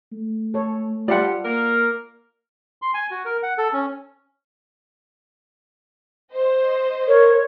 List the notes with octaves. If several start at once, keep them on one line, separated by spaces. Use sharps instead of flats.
A3
A4 C#5
G3 F4 A4 D5 F#5
A#3 A#4
C6
G#5
F#4
A#4
F#5
A4
C#4
C5 D#5
A#4 C#5